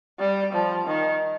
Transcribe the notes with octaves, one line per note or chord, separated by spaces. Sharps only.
G3
F3
D#3